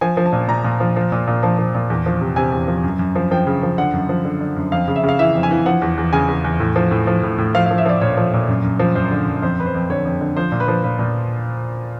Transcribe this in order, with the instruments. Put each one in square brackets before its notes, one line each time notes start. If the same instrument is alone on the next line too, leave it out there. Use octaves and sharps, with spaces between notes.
[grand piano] F3 G#5
F3
A5
A#2
A#2 A#5
A#2
F3
F3
A#2
A#2
F3 A5
F3
A#2
E2
F3
C3
C3 G#5
E2
F3
F#2
F#2
F3
F3 G5
C#3
F3
D3 F#5
F#2
F3
D3
D3
F#2
F2 F5
C#3
E5
C#3 F5
E3 E5
F2
G#5
E3
F3 F#5
E2
E2
C#3 G#5
E2
E2
A2
F3
A2
F3
A2
A2
F3 F5
F5
F3
E5
F3 D5
A#2 C#5
F3
A#2
F#2
F#2
F3
F#2 C5
D3
F#2
F2 C5
F2 B4
C5
F2
D3 C#5
F2
D3
F3 C5
A#2
B4
F3
A#2 B4
A#2